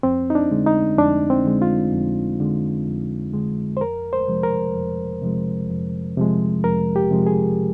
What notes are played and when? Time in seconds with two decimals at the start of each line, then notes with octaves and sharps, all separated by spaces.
0.03 F2 C4
0.30 D#4
0.35 D4
0.51 D3 G#3
0.66 D#4
0.98 F2 D4
1.30 C4
1.45 D3 G#3
1.62 F4
1.92 F2
2.40 D3 G#3
2.87 F2
3.34 D3 G#3
3.77 C5
3.81 F2 A#4
4.13 C5
4.28 C3 F3 G#3
4.43 A#4
4.75 F2
5.22 C3 F3 G#3
5.70 F2
6.17 C3 F3 G#3
6.64 F2 A#4
6.96 G4
7.11 C3 F3 G#3
7.27 G#4